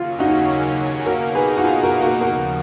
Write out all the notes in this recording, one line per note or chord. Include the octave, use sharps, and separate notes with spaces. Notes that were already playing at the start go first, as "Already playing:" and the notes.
Already playing: D#2 C#3 F#3 A#3 C#4 F4
D#4 F#4
B2 A#3 D#4 F#4 A#4
G#4 B4
F#4
F4 G#4
F#4 A#4
F#4 A#4
D#2 C#3 F3 F#4 A#4